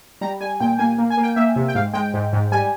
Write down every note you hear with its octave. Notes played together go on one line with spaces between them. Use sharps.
G3 A#5
G3 G#5
A#2 G5
A#3 G#5
A#3
G#5
A#3
G5
A#3 E5
C3
G5
G#2 F5
G#3 G5
G#2
G#2
G3 G#5